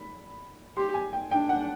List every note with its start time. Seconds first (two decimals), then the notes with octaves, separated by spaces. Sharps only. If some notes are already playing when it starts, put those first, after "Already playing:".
Already playing: B5
0.77 G4 C6
0.94 G#5
1.13 G5
1.31 D4 G5
1.49 F#5